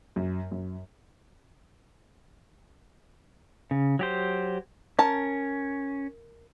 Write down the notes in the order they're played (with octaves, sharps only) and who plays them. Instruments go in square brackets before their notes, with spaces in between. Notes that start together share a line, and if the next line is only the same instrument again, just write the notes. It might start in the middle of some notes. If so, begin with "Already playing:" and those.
[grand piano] F#2
F#2
[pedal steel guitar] C#3
F#3 G4 C5
[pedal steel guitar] C#4 [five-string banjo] A#4 A5